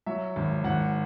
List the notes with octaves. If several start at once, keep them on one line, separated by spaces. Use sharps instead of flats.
F#3 E5
G#1
G#1 F#5